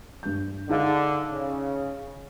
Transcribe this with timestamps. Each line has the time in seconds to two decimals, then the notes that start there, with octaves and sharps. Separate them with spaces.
0.23 G2 G6
0.69 D3 D#4 G#4 F5
1.32 C#3